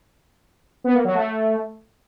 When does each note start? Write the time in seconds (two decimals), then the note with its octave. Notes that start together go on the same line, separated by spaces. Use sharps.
0.84 B3
0.94 A#3
1.05 F#3
1.15 A3